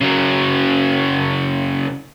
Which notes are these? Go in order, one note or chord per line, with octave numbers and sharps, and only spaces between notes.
C#3 F#3